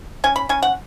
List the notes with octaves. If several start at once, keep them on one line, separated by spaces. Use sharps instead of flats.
C#4 G#5
B5
C#4 G#5
F#5